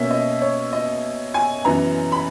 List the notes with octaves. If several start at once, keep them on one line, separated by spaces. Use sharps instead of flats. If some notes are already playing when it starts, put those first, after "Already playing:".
Already playing: B2 A#3 C#4 E5
D#5
C#5
D#5
G#5
F#2 E3 B3 A#5
B5